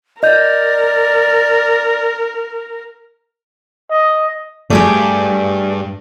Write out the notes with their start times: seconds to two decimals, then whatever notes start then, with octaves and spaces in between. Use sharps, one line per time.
0.23 A#4 D5 D#5 G6
3.90 D#5
4.70 G2 A3 G4 G#4 D5